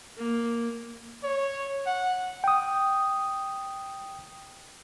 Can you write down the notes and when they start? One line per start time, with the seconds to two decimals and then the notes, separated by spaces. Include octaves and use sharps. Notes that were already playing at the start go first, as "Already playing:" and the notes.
0.18 A#3
1.23 C#5
1.86 F#5
2.44 G5 D#6